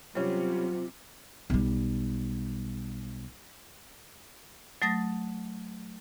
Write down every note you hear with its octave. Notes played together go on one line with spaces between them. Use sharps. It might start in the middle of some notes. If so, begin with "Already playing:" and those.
C3 F#3 G3 C#4 F4
B1 G3
F#3 A3 D#6 A6 A#6